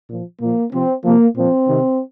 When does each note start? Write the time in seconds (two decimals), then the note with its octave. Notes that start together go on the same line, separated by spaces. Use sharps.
0.09 A#2 F3
0.40 A#2 F3 A#3
0.71 C3 F3 C4
1.03 C3 F3 A#3
1.34 A#2 F3 C4
1.66 C3 D#3